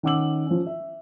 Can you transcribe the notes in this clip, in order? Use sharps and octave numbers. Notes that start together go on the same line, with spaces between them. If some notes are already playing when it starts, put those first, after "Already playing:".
D#3 C#4 F#5 D6 E6 F#7
F3 C#4
E5